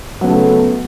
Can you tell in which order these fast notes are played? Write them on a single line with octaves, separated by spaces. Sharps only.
F#3 B3 C#3 A3